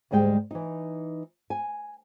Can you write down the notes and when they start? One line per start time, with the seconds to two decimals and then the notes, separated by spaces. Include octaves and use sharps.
0.11 D2 G#2 G3 G#3 G5
0.51 E3 D#4
1.50 G#5